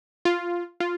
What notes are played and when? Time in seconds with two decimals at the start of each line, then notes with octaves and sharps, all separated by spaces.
0.25 F4
0.80 F4